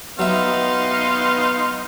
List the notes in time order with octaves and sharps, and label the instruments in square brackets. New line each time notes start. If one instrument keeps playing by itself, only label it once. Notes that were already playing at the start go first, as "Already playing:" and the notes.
[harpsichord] F#3 E5 [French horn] B3 [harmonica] D#4 F5 [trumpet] C6